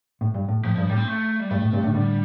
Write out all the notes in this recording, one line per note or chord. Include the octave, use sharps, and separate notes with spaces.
A2
G2
A2
A2 F3
G2 F3
A2 G3
C4
A3
G3
G2 A3
A2
G2 C3
A2 D3
A2 D3 G3